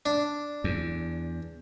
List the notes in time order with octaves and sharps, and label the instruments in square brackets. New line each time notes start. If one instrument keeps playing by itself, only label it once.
[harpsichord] D4
[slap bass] E2